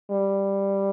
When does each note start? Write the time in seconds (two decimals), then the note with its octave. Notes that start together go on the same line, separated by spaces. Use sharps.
0.11 G3